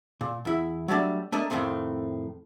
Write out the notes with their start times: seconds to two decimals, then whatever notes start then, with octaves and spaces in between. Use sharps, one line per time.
0.21 A#2
0.45 E2 E4
0.88 F#3 G3 A3 D4
1.32 A3 A#3 D4 D#5
1.50 F2 A2 D#3 A3 C4